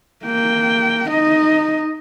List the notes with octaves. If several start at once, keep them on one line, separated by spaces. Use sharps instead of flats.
A#3 G5
D#4 D#5